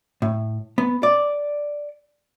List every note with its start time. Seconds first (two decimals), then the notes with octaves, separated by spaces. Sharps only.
0.22 A2
0.78 B3
1.03 D5